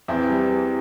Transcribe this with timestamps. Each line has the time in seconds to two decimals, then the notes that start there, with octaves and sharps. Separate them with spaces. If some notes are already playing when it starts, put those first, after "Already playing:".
0.08 E2 C4 E4
0.29 G3
0.49 G3